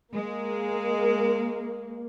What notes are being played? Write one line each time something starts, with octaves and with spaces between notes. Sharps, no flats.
G#3 A#3